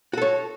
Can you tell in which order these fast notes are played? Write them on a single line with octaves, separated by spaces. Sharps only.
F#4 A4 C#5